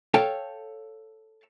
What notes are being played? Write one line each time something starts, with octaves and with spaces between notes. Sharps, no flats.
A4 C#5 F5 G5 A5